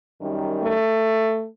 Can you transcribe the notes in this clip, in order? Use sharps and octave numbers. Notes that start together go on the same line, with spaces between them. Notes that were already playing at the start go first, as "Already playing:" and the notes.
F#2 D#3 G3
A3